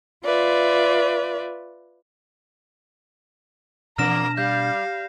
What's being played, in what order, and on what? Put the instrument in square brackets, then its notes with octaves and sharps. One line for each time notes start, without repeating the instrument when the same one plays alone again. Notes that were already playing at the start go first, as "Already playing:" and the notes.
[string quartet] F4 B4 D5 E5
[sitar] E2 A#3 [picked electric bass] B2 D4 [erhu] A#5 [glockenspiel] F6 A#6 E7
[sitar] G3 [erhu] F5 [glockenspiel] G6